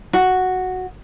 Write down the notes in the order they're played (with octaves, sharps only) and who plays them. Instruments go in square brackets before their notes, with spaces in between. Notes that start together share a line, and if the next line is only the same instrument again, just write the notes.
[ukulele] F#4